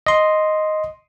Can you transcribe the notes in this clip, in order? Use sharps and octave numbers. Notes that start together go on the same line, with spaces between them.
D#5 C6